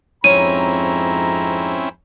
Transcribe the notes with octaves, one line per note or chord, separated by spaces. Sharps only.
F2 G#2 C4 C#4 E4 C#5 A#5 D#7